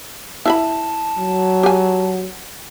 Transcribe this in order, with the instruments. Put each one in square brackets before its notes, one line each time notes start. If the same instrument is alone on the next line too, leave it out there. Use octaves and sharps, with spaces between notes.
[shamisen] E4 E5 B5 [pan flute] A5
[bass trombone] F#3
[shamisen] G4 G#5